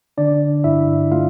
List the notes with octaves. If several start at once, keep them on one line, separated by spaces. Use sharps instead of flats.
D3 D4 D5
G2 E4 E5
A3 F4 F5